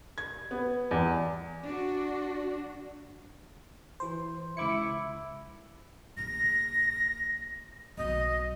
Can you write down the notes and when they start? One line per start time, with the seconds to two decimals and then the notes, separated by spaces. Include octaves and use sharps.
0.18 G#6
0.51 B3
0.91 E2
1.64 D4 F#4
4.00 E3 C5
4.57 C#2 E4 D6 C#7
6.17 A#1 D3 A#6
7.97 B1 F#3 D#5